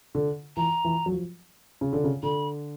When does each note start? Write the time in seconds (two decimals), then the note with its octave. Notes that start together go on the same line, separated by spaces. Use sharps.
0.15 D3
0.56 E3 A#5
0.85 E3
1.06 F#3
1.12 F3
1.81 C#3
1.93 D3
2.04 C#3
2.23 D3 B5